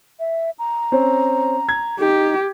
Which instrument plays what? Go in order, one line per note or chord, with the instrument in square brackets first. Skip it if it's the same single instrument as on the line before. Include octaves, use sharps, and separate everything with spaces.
[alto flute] E5
A#5
[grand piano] C4 C#4
G#6
[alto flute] D#4 [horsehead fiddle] G4